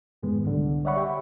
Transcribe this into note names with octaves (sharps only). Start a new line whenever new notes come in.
F2 G#2 D#3 G#3 B3
C2 D3 G3
C#5 D5 E5 F#5 B5 C#6
G4 E5 G5